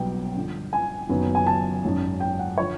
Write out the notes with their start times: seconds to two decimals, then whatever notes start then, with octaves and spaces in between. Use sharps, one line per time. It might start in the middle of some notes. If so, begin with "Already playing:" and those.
Already playing: B1 B2 G3 B3 D#4 G5
0.35 G2 D3 F3
0.73 G#5
1.09 F#1 F#2 D#3 F#3 B3
1.35 G#5
1.47 A5
1.84 G#1 F#2 D#3 G#3 C#4
2.20 G5
2.39 F#5
2.58 D3 F3 C#5